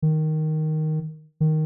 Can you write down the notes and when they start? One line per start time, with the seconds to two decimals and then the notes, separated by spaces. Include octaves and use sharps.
0.02 D#3
1.40 D#3